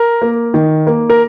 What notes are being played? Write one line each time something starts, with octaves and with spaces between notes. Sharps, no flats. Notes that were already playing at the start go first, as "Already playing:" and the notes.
Already playing: A#4
A#3
D#3
A#3
A#4